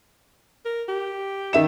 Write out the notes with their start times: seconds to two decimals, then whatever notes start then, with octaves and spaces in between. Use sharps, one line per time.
0.65 A#4
0.89 G4
1.53 D#3 E5 E7